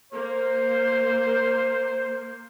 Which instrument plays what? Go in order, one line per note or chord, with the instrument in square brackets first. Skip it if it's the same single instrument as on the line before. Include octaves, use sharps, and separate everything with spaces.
[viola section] A#3 [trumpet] C5